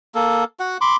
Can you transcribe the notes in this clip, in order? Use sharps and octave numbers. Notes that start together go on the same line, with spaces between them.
A#3 A4
F#4 F#5
B5 C6 D6